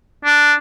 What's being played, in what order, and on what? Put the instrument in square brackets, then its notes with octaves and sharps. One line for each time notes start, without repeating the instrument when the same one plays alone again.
[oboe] D4